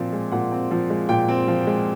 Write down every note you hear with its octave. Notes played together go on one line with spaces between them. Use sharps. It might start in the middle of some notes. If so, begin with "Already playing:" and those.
Already playing: A#2 F3 C4
G#3
A#2 F#5
C4
F3
G#3
A#2 G5
C4
F3
G#3